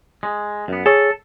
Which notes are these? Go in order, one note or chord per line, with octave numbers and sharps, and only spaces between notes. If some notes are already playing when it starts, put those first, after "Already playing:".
G#3
F#2 B3
G#4 A4 C#5